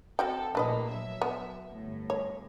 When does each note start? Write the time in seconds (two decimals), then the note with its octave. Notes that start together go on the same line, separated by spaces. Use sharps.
0.19 C4 F#4 A4 G5
0.55 A#1 A2 A#3 D4 B4 D#5
0.89 F#3 E5
1.22 B3
1.72 G1 A2
2.10 C#5